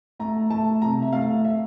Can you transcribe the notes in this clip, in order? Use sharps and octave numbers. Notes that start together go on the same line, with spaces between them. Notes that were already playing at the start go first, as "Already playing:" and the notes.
A3 A#5
A3 A5
C3 A#5
E5
A3 F5
E5